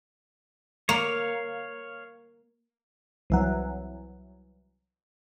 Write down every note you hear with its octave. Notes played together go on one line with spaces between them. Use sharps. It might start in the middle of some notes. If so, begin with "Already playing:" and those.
A#3 C#5 F5
C2 E3 F#3